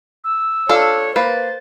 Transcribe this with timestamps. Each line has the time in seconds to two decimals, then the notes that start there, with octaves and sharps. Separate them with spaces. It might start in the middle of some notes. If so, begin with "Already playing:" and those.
0.24 E6
0.69 D4 F4 A4 C#5
1.16 A#3 B4 C5 A6